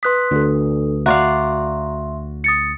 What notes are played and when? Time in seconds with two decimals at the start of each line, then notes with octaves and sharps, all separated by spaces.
0.03 B4 C6 D#6 F#6 B6
0.31 D2 D4 A4
1.06 F#4 D5 E5 F5 A#5 C6
2.44 D#6 A6 C#7